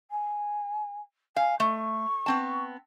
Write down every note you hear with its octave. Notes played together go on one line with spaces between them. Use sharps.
G#5
F5 G#5
A3 C#6
B3 C4 A5